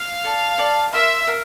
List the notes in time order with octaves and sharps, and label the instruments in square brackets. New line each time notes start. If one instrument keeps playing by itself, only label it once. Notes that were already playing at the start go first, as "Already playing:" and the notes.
Already playing: [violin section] F5
[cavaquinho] A4 D5 A5
A4 D5 A5
[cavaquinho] A#4 F5 C6 [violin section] E5
[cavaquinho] A#4 F5